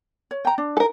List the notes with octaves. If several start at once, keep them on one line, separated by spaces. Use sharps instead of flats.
C#5
G5 A#5
D4
A4 A#4